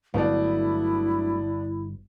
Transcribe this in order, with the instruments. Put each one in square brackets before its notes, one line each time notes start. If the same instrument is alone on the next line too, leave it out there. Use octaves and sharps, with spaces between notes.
[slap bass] G1 [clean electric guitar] D3 F#3 A3 [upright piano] B3 D4 [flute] E4